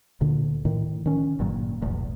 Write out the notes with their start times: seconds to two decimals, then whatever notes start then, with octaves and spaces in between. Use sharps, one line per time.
0.21 D2 A#2 D3
0.65 A2 D#3
1.06 D#3 C#4
1.39 G1 G2 A#2 F#3
1.82 F1 B1 E2 A2